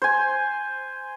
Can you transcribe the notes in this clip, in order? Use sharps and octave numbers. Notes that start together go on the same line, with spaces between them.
C5 G#5